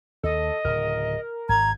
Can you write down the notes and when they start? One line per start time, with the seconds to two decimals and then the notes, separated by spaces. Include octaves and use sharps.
0.23 D#2 A4 D#5
0.65 D1 C#3 A#4
1.49 G#1 A#5 G#6